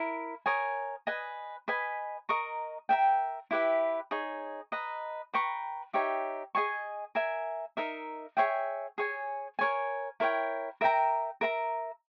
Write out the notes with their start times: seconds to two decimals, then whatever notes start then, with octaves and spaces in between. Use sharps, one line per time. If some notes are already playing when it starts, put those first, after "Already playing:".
Already playing: E4 A#4
0.46 A#4 C#5 G#5 D#6
1.07 B4 D#5 G#5
1.68 B4 D#5 G#5 B5
2.29 A#4 D#5 A#5 C#6
2.89 A#4 E5 G5
3.51 E4 G4 B4 E5
4.11 D#4 G#4 C#5
4.72 B4 D#5 A#5
5.34 B4 G5 A#5 C#6
5.93 D#4 G4 C#5 E5
6.55 G#4 D#5 G#5 C#6
7.15 A#4 E5 G#5
7.77 D#4 A#4 E5
8.37 G#4 C#5 E5 G5
8.98 G#4 C#5 G#5
9.59 A#4 C#5 G#5
10.20 E4 A#4 C#5 G5
10.81 A#4 E5 G5 A#5
11.41 A#4 E5 A#5